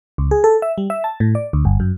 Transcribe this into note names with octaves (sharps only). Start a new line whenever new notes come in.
C#2
G#4
A4
E5
G3
E5
A5
A2
D5
D2
G1
F#2